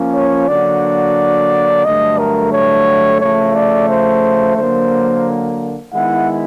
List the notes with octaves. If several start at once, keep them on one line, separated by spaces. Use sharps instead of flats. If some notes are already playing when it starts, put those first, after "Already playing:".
Already playing: F3 A#3 C#4
C#5
D3 F#3 A#3 D4 F#4 D5
G2 D3 F#3 A3 D#5
A#4
C#5
C#3 F3 A3 C#5
D5
C5
D3 F#3 A#3 C5
D#3 G#3 B3 E4 F#5